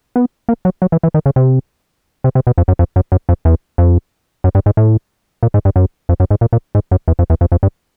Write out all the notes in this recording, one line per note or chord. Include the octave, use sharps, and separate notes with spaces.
B3
A#3
F#3
F#3
E3
E3
D#3
C#3
C3
C3
C3
B2
F2
F#2
F2
F#2
F#2
F2
E2
F2
F#2
G2
G#2
A2
A#2
G#2
G2
F#2
F2
F#2
G#2
A#2
A#2
G#2
F#2
E2
F2
E2
F2
F2
G2